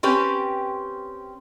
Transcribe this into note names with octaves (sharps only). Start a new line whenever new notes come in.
C4 C#4 G4 B4